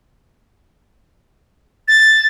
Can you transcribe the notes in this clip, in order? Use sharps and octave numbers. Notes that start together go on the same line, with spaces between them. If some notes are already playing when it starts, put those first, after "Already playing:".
A6